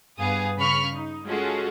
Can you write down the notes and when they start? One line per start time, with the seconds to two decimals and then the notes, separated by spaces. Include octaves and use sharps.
0.17 G2 B3 G#4 F5 G#5 D#6
0.58 C#3 B5 C#6 F6
0.92 D#4
1.26 G#3 C#4 F4 F#4 G#4 A4